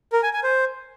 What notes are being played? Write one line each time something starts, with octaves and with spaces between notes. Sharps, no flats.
A#4
G#5
G#5
C5